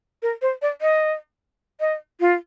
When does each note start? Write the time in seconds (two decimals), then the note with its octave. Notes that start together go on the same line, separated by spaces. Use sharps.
0.22 A#4
0.42 C5
0.62 D5
0.81 D#5
1.80 D#5
2.20 F4